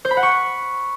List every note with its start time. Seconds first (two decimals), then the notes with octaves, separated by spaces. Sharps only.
0.05 C5
0.11 B5
0.17 F#5
0.23 C#6